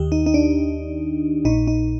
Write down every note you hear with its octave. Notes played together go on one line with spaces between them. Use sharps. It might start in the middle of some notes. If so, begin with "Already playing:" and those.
Already playing: D#2 D#3 G4
D#4
D#4
D4
A#1 A#2 D#4
D#4